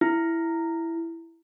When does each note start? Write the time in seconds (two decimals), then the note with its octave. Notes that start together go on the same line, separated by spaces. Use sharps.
0.01 E4